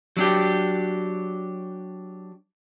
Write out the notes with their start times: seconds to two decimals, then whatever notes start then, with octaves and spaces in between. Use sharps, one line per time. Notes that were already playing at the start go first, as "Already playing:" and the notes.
0.17 F#3 D4 G4